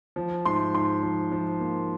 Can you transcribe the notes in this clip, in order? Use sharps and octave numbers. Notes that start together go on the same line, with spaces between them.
F3
G#2 C6
G#2 C6
F3
F3
A#3